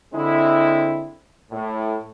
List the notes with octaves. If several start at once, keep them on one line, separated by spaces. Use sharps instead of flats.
D3 G#3 C4 E4
A2